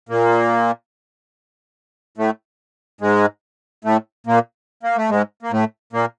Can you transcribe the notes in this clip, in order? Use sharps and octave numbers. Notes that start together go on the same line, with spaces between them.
A#2 A#3
A2 A3
G#2 G#3
A2 A3
A#2 A#3
A#3
A3
G#2 G#3
A#3
A2 A3
A#2 A#3